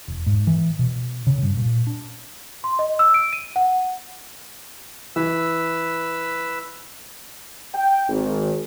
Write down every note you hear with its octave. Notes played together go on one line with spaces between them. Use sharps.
E1
G#2
E3
B2
C#3
G2
A#2
D4
C6
D#5
E6
D7
D#7
F#5
E3 B4 E6
G5
G#1